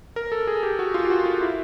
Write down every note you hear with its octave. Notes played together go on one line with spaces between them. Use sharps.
A#4
A4
G#4
G4
F#4
F4
G4
F#4
F4
E4